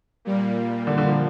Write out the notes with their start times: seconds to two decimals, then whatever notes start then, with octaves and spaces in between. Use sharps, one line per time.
0.25 A#2 G3 A#3
0.87 D3
0.98 D3
1.08 F3